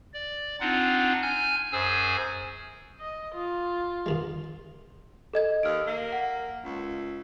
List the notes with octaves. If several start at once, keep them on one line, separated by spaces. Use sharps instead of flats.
D5
C4 D4 D#4 F4 F#5
G#5 F6 G6
F#2 G#4 C5 G#5 E6
D#5
F4
G2 D#3 G#3
A4 D#5 G#6
D#2 F6 D7
A#3
F#5
C#2